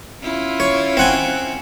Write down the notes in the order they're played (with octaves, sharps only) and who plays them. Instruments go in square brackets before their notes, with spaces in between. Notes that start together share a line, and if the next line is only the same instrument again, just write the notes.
[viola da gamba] C#4 E4 F4
[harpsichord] C#5
C4 F#5 G#5